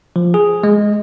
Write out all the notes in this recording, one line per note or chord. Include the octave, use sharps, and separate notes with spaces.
F3
G#4
G#3